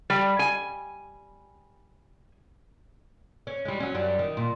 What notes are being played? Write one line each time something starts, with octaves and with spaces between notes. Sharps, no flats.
G3
G#5
C#4
G3 G#3
F#3 C#4
F#2 F#3 G3
D#3
A#2